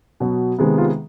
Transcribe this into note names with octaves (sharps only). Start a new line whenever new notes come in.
B2 F#3 B3
C3 D#3 G#3 B3
F4